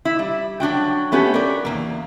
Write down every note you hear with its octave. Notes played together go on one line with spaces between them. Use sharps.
E4
G3
F#3 D4 F#4 G5
A3 B3 C#4 F#4 G4
A#4 D5
E2 C#3 A#3